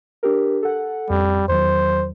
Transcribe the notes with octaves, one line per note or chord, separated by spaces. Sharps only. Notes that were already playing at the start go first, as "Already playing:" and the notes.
D4 G4 A#4
A4 F#5
F2 G3
E2 D#3 F#3 C5